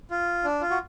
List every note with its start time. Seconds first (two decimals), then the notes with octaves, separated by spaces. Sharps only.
0.11 F4
0.44 D4
0.61 F4
0.71 F#4